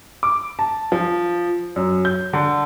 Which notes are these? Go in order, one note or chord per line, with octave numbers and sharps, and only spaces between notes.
D6
A5
F3
F#2
G6
D3